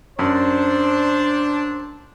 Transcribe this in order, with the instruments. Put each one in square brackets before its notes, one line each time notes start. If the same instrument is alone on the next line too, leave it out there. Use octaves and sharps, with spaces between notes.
[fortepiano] F#2 [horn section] D4 [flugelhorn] C5